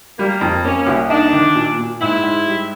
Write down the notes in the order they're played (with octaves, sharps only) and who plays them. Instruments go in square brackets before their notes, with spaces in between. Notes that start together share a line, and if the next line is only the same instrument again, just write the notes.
[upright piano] G3 [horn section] A#3
[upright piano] F2
[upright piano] A#3 [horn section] C#4
[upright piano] C2
[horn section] D4 [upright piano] D#4
[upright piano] D#3
A#2
A#2
[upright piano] G#2 [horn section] E4
[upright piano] G#2
G3